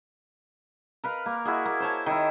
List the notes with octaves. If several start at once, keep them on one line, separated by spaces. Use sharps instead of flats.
A#4 B4 F5
A#3
E4 F#4 G#4
A#3
C5 C#5 A5
D#3 E4